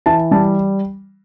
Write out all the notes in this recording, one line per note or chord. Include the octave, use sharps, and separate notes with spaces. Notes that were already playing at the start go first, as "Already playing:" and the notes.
E3 A5
G3 A5